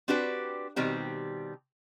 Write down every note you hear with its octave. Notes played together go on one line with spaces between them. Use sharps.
C4 D4 F#4 G4 B4 D5
B2 D#3 G3 C4 G4